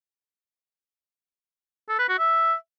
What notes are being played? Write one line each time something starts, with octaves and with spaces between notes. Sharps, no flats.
A4
B4
F#4
E5